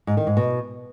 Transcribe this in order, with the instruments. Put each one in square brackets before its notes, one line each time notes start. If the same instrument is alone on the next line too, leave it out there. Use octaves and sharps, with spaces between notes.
[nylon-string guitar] G#2
D#3
G#2
B2